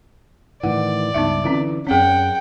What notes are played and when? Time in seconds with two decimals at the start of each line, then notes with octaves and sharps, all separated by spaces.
0.63 A2 D#3 E3 D5 F#5
1.14 C#2 G2 B3 D#4 E5
1.44 D3 E3 C4 C#4 F4
1.87 F#2 C4 C#4 G#4 F#5 G5